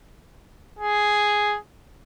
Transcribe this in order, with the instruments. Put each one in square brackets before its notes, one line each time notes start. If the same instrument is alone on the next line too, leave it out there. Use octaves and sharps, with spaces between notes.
[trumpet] G#4